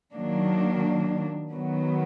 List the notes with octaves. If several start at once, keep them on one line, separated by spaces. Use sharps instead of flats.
D#3 F#3 A#3 D4
D#3 F#3 B3